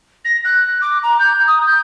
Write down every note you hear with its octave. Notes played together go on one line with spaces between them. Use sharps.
A#6
F#6
D6
A#5
G6
D#6
G6